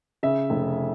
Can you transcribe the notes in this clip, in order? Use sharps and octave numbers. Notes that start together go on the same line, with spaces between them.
C#3 E5
F1